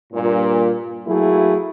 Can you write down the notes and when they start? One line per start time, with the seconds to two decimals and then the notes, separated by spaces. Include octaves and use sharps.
0.13 G2 A#2
1.06 F#3 A3 A#3 E4 F#4 G#4